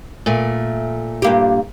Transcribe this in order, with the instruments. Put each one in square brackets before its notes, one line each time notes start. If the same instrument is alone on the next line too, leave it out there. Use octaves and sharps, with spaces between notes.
[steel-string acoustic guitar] A#2 A3
[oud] G2 A#3 G4